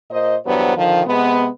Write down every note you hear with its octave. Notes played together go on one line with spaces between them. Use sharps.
A#2 C5 D#5
E2 G2 F#3 B3 C5
D3 D#3 F3
C3 G#3 B3